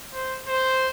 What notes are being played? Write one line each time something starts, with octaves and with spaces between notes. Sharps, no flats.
C5
C5